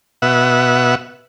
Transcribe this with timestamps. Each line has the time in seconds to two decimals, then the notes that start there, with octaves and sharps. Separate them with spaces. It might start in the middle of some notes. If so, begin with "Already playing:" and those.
0.22 B2 E5 F#5